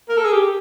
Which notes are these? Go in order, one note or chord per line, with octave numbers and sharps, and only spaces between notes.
A#4
A4
G#4
G4